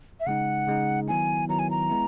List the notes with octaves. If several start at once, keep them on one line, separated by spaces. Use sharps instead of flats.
E5
C#3 G#3 D#4 F#5
C#3 G#3 D#4
D#3 F#3 B3 E4 G#5
D#3 F#3 B3 E4 A#5
G#5
A#5
G#3 B3 E4